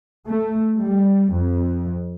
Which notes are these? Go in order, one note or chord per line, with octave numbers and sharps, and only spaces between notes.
A3
G3
F2